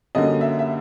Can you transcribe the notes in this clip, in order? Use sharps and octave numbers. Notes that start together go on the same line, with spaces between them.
F#2 D3 G3 A#3 D#5
E5
E5